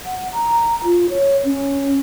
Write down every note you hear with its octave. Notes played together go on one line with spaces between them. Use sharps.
F#5
A#5
F4
C#5
C#4